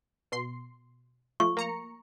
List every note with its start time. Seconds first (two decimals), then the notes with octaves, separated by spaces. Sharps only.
0.32 B2 C6 C7
1.40 F3 A3 C#6
1.57 A#3 A#5 C#7